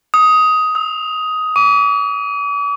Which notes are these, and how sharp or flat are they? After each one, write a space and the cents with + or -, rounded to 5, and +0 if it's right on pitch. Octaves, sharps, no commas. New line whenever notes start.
D#6 +10
E6 -35
D6 -45